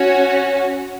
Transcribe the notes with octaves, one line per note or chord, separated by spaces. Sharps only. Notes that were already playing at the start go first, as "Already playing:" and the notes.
Already playing: C#4 F#4 C#5